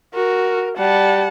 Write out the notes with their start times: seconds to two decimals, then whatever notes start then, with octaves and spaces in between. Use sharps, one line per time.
0.14 F#4 A#4
0.77 G3 F#5 A5